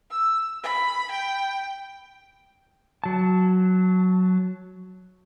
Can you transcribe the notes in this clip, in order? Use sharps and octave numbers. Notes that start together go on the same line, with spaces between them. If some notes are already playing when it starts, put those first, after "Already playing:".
E6
B5
G5
F#3 A5